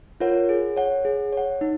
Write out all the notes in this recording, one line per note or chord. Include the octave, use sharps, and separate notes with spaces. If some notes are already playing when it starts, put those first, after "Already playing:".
F4 A#4 C#5 F#5
G#4
C#5 F#5
G#4
C#5 F#5
D#4